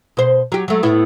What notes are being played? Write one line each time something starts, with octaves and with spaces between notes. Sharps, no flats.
B2 C5
F#3 G4
F#3 A3
A2 B3 E4